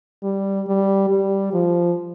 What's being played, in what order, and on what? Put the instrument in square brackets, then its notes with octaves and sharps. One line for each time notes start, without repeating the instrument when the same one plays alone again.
[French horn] G3
G3
G3
F3